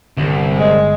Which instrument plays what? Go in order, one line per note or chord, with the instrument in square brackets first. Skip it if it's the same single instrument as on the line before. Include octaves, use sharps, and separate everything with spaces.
[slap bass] G1 D3 [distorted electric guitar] C2
[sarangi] G#3